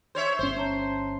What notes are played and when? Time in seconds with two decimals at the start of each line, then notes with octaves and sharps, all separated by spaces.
0.15 C5 C#5 E5
0.39 G1 C#4 C5
0.56 C#5 A5 A#5